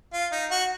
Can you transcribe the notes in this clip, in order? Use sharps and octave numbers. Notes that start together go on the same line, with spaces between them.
F4
D#4
F#4